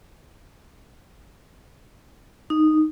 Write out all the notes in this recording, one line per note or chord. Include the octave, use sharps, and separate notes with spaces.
D#4